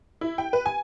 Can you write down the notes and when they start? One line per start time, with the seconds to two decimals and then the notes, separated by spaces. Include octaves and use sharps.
0.21 E4
0.38 G5
0.53 B4
0.66 G#5